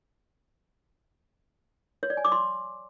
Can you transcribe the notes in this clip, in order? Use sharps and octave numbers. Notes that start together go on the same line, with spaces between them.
C#5
D5
G#5
D6
C6